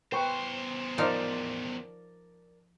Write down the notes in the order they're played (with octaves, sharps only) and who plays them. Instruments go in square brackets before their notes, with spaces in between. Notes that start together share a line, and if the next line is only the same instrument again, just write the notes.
[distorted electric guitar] E2 C5 [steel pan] B4 G5 C#6
[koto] F3 D#4 F5 [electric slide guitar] A#4 D5 A5